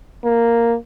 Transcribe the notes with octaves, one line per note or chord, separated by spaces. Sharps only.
A#3